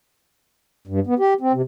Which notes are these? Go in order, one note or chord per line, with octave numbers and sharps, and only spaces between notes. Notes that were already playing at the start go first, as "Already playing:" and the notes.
G2
B3
G4
C4
C3